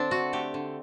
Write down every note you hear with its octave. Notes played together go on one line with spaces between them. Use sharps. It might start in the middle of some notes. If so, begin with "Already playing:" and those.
Already playing: D3 C4 D4
A3 F#4
A3 G4
D3